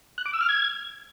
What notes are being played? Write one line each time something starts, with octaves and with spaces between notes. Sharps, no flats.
F#6
D6
E6
F6
G#6